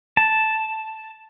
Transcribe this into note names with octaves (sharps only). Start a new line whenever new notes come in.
A5